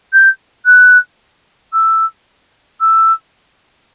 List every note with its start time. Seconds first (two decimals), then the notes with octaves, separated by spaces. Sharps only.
0.13 G6
0.66 F#6
1.73 E6
2.81 E6